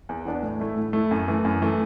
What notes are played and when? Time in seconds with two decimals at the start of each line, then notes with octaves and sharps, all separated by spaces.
0.09 E2
0.25 E3 B3 D4
0.43 A2
0.60 A3 E4
0.76 A2
0.93 A3 E4
1.11 F#2
1.28 E3 A3
1.45 F#2
1.62 E3 A3